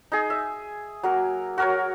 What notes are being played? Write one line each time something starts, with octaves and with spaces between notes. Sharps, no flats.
D#4 G#4
E5
F#3 A#3 A#4
F#4 A#4 C#5